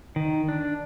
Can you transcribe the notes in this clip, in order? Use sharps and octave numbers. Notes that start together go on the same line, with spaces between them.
D#3
D4